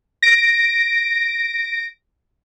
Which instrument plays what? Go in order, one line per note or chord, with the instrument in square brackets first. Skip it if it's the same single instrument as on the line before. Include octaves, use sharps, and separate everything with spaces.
[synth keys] A#6 D7